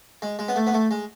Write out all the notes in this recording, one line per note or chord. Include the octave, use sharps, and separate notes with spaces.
G#3
G#3
B3
A3
B3
A3
G#3